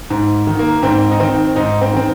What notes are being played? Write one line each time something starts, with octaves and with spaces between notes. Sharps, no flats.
G#2
D#3
A#3
G#2 C4
D#4
D#3 C4
G#2 D#4
C4
D#3 C4